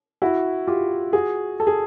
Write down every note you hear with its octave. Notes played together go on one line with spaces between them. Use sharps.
E4 F#4
F4 G4
F#4 G#4
A4
G#4